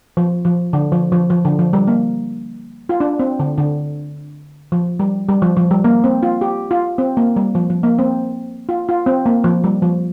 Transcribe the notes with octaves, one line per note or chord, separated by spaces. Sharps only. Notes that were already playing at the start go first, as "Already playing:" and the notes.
F3
F3
D3
F3
F3
F3
D3
F3
G3
A#3
F4
D4
C4
D3
D3
F3
G3
G3
F3
F3
G3
A#3
C4
F4
G4
F4
C4
A#3
G3
F3
F3
A#3
C4
F4
F4
C4
A#3
F3
G3
F3